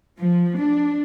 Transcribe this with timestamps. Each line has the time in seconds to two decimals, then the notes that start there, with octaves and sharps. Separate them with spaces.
0.17 F3
0.58 D4